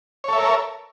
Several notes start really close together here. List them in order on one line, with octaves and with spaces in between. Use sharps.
C#5 A4 E5 A#4